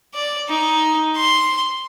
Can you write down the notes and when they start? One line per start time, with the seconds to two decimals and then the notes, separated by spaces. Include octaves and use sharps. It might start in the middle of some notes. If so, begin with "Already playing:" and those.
0.14 D5
0.49 D#4
1.17 C6